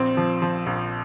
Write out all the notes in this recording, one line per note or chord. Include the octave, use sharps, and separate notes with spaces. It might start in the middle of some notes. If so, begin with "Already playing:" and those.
Already playing: A#1 C4
F3
F3
A#1